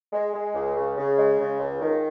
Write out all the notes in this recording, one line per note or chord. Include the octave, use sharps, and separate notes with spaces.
G#3
G#3
C#2
C#3
C#3
G#3
C#3
C#2
D#3